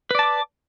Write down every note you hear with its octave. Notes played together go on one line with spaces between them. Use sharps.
B4 D5 A5 D6